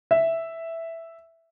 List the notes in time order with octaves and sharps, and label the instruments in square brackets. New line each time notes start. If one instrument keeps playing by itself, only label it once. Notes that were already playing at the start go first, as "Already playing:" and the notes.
[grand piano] E5